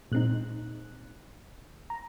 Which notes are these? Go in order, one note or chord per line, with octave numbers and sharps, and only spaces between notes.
A#2 G#3 C4 D#4 F#6
A#5